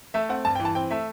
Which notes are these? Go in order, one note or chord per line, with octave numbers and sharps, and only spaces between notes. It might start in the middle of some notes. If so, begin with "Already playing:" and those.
A3 E5
C4 F#5
G2 A5
G5
E3
A5
C4 G5
A3 E5